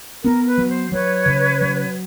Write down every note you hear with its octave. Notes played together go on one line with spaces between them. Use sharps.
B3 A#4
B4
F#3
C5
F#3 B4 C#5
C#3
F#3